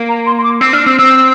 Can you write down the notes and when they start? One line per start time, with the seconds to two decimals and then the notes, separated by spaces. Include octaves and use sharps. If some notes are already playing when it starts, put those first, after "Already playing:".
Already playing: A#3
0.09 A#5
0.26 C6
0.38 C6
0.44 D6
0.61 C4 E6
0.73 D4 F6
0.86 C4 E6
0.99 C4 E6